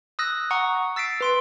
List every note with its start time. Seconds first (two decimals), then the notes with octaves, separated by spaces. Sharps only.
0.19 D#6 E6 F#6 A#6
0.51 F#5 A#5 C#6 D#6
0.96 E6 A6 B6 C7 D7
1.21 B4 C6 D7